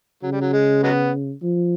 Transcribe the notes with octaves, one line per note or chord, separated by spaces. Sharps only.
C#3 F#3
G3
F#3
G#3
F#3 G#3 B3
F3